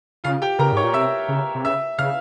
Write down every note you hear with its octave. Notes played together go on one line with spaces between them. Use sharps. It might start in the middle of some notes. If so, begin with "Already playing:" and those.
C#3 F4 F5
G4 G5
C#3 A#4 A#5
G#2 C#5 C#6
A#2
C3 E5 E6
C#3
C3
C#3 E5 E6
C#3 F5 F6